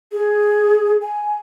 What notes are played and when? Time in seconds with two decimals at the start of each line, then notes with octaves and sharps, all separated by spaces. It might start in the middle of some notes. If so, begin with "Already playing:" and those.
0.12 G#4
1.01 G#5